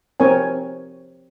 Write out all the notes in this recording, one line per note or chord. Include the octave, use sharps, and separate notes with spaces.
C4 A#4 C#5 G#5